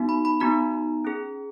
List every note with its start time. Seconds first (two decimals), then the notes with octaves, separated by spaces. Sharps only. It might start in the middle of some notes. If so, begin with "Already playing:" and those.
Already playing: B3 D#4 F#4
0.09 B5
0.25 B5
0.40 B3 D#4 F#4 A#5
1.05 C#4 G#4